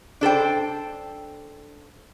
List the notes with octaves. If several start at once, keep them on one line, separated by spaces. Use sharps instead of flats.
D4 A4 C5 G5